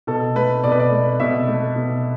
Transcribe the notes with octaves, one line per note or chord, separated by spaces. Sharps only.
B2 A4
A3 B4
B2 D5
B4
D5
A3
B2 E5
A3
B2